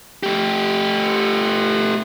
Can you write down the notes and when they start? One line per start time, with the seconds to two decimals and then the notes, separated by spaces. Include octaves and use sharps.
0.23 A3 G4